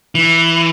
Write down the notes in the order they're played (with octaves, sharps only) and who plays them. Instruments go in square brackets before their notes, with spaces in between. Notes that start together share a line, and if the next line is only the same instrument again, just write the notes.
[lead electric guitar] E3